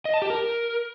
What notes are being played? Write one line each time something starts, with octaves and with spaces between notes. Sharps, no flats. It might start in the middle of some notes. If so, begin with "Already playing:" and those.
D#5
A5
G4
A#4